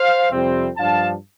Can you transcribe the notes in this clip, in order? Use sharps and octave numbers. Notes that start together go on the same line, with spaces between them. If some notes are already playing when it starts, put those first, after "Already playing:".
Already playing: C5 F5
F2 C3 G3 C4
G2 F3 D4 F5 A5